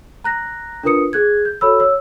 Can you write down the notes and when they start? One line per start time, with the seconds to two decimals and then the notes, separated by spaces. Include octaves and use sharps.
0.24 A#5 F#6 A#6
0.83 D4 F4 A#4 B4 D#6 C#7
1.13 G#4 F#6 G#6
1.45 G6
1.61 F#4 A4 C#5 B5 E6
1.80 C#5 E6